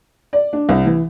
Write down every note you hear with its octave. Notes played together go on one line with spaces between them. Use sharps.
D5
D4
C2
E3